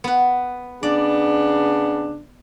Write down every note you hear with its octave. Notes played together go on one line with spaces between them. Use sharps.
B3 B4
C#3 B3 D4 D5